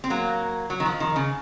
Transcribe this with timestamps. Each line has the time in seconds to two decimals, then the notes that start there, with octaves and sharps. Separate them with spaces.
0.04 C4
0.10 F#3 A#3
0.70 F#3
0.80 D#3
0.86 F3
1.00 D#3
1.16 C#3